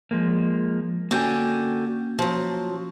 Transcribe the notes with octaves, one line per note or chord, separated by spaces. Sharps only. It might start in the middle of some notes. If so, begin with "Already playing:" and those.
F3 G#3 A#3
D3 A#3 C#4 F#4 G5 G#5
F3 F#3